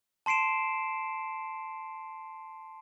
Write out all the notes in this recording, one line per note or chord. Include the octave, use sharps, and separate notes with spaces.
A5 C6 C7 D7 E7